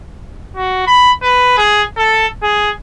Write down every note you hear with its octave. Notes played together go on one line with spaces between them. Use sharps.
F#4
B5
B4
G#4
A4
G#4